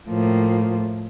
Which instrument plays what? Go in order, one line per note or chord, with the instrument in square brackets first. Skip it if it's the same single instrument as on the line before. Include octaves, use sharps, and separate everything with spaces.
[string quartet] A2 F3 A#3